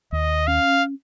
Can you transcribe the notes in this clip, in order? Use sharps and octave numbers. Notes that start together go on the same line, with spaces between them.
D#2 D#5
C#4 F5